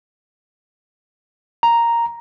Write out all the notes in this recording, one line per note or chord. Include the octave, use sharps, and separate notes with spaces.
A#5